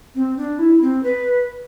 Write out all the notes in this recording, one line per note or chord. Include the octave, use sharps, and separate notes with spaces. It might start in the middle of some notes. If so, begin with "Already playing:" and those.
C4
D4
E4
C4
B4